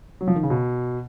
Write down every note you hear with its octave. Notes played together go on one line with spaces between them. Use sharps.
F#3
F3
D#3
C#3
B2